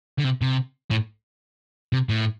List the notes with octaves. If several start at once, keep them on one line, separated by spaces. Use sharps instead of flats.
D3
C3
C3
A2
C3
A2